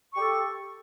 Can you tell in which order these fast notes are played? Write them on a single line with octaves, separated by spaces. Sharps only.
C#6 G4 A4